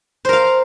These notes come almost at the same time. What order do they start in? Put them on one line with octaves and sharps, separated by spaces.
C5 A#4 F5